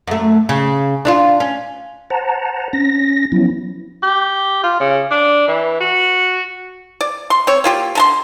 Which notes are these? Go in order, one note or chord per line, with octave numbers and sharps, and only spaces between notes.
F#2 A3
C#3
D4 D#4 F4
C#4
C5 F#5 A5 A#5
C#4 A#6
F3 F#3 B3 C#4 E4
G4
F4
C#3
D4
E3
F#4
D5
C6
C4 C#5
A#3 F4 G4
D3 A5 C6